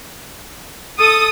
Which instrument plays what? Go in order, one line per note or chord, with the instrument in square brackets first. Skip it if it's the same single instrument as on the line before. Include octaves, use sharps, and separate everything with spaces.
[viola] A4 [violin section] D#6